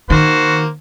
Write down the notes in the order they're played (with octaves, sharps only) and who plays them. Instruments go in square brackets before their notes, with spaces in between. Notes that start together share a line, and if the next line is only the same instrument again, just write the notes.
[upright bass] D#3 [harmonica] A#3 C5 [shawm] F#4